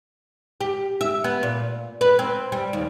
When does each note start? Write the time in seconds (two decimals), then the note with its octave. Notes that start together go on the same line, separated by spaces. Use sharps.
0.61 G4
1.01 E5
1.24 B3
1.43 A#2
2.01 B4
2.19 C4
2.52 G3
2.73 D#2